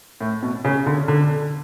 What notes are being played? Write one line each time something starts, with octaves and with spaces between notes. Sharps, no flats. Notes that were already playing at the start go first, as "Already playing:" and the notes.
A2
B2
C#3
D3
D3